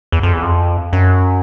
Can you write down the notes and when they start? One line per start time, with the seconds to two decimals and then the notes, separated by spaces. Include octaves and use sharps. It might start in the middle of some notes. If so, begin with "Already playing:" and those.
0.12 E2
0.23 F2
0.33 E2
0.43 F2
0.93 F#2